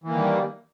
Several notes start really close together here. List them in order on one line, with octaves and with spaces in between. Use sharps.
E3 A#3 D#3 G3